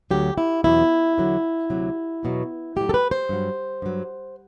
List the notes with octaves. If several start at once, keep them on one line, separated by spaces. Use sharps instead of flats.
D2 D3 F#3 G4
E4
E2 B2 F#3 E4
E2 D3 F#3
D2 C3 F#3
E2 B2 F#3
A2 F#3 G4
A4
B4
C5
G2 F#3
G2 F#3